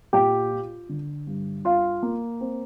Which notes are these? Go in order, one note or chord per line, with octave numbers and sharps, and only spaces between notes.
A#2 G4 G5
F4
D3
G2
F4 F5
A#3
C4